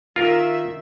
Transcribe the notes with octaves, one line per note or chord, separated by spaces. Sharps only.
D#3 F4 A#4 E5